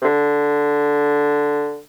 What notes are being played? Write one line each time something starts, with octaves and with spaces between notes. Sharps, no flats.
C3
D3